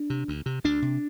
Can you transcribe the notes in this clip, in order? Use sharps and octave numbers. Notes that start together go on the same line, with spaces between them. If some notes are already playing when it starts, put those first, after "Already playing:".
Already playing: D4
C3
D2
C3
D2 D4
C3